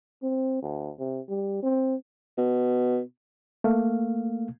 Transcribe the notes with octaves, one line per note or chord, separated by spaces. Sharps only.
C4
D2
C3
G3
C4
B2
A3 A#3 F5